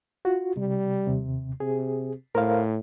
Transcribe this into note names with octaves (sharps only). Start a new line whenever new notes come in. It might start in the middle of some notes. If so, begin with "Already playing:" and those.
F4 F#4
C3 G3
D#2 C3
C3 G#4
A2 A#4 C5 F5